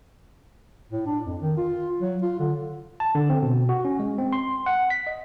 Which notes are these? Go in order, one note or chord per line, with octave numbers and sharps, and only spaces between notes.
A2
D4
F2
D#3
F4
F#3
F4
D3
A5
D3
C4
B2
F#4
C#4
G#3
C4
C6
F#5
B6
D#5